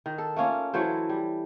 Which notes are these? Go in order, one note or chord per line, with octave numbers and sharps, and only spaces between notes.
D#3
A4
A3 A#3 C#4 F4
E3 F#3 A3 C5
G3